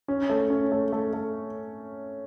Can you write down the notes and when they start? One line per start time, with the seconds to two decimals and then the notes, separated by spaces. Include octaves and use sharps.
0.08 C#4
0.30 A3
0.50 C#4
0.72 A3
0.92 A3
1.13 A3